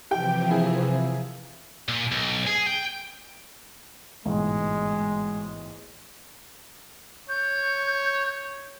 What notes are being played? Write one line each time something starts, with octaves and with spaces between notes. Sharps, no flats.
C3 E3 F3 G4 G5
A#3 E4 G#4
A#2
B1
G#4
G5
A1 G#2 B2 G#3
C#5 G6